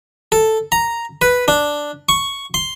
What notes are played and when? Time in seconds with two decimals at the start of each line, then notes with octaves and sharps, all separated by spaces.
0.32 A4
0.72 A#5
1.22 B4
1.48 D4
2.09 C#6
2.54 C6